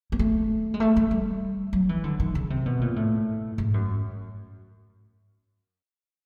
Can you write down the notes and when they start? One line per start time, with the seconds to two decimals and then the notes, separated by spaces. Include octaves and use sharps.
0.12 A#3
0.19 A3
0.74 G#3
0.80 A3
0.96 A3
1.11 G3
1.73 F#3
1.89 E3
2.04 D3
2.20 D#3
2.35 C#3
2.50 C3
2.66 B2
2.81 A#2
2.96 A2
3.58 G#2
3.74 F#2